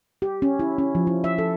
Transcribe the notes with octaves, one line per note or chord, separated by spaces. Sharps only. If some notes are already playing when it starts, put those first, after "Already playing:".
G4
C#4
E4
C#4
F3
E4
E5
A4